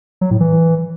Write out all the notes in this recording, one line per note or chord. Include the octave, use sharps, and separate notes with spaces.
F#3
A2
E3